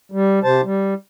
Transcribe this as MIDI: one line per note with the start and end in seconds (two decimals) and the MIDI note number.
0.12 0.39 55
0.44 0.61 48
0.44 0.61 72
0.44 0.61 81
0.64 0.94 55